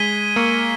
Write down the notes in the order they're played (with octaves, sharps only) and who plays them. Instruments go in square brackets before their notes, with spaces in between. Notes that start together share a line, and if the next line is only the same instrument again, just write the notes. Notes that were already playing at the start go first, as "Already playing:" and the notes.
Already playing: [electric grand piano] G#3 [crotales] G#6 B6 D#7 G7
[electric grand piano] A#3 [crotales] C#6 E6 G#6 C#7